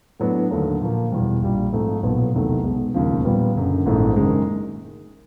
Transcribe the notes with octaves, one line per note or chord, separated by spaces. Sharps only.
A2 F#3 B3 D4
D#2 D3 F#3 A3
A#2 F3 A#3
E2 B2 G3
A#1 A#2 G3
G#2 F3 A3 C4 D#4
B1 A#2 F#3 B3
E2 C3 D#3 F#3 A3
B1 B2 G#3
E1 D#2 C#3 F3
A#2 G3 B3
F#1 F#2 D3
A#1 G#2 E3 A3 C4
F#1 F#2 D#3 G#3